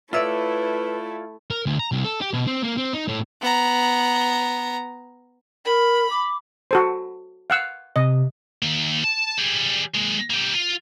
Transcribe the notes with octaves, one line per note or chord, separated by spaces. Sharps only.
A3 E4 F4 B4 C#5 D5 E5 E6
A#4
D2
A#5
C2
A4
G4
B2
C4
A#3
C4
D#4
A2
B3 A#5
A#4 B5
D6
F#4 A4 C5
F5 F#5 E6
C3 D#5
D#3 A#3
A5
G3 G#4
G#3 A#3
G3 A#3
F4